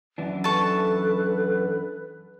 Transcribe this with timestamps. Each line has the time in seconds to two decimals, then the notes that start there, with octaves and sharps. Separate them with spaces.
0.18 F#2 E3 D4
0.44 A4 B4 A5 C#6